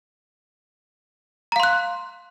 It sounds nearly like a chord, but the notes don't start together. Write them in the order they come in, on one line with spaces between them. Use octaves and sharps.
A#5 F5 C6 F#6